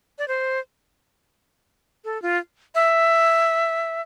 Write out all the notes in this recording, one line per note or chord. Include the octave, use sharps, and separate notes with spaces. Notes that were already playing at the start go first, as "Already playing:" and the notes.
D5
C5
A4
F4
E5